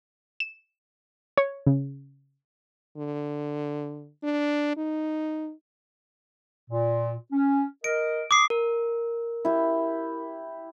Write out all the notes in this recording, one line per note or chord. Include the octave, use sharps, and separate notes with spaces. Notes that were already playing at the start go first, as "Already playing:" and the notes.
E7
C#5
C#3
D3
D4
D#4
A#2
C#4
A#4 D#5 D7
D6 D#6 C7
A#4
E4 G4